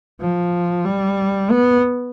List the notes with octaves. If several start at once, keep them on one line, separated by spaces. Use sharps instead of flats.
F3
G3
B3